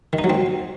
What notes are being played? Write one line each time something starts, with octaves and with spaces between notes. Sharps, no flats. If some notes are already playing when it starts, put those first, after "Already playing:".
D#3
D#4
F#3
C4